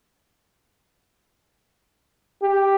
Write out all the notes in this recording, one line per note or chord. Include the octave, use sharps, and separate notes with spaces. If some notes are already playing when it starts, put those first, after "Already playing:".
G4